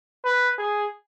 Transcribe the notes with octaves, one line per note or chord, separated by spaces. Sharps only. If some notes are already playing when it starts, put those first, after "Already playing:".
B4
G#4